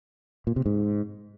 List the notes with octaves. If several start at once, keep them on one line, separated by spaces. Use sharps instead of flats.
A#2
C3
G#2